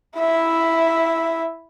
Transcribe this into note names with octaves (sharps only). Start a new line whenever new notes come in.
E4 E5